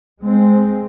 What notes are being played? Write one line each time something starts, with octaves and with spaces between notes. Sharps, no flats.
G#3 C4